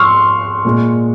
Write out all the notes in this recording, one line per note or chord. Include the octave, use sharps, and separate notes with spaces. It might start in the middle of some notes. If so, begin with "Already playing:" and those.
Already playing: G#2 F3 C6 C#6 E6 F6
A#2 G#3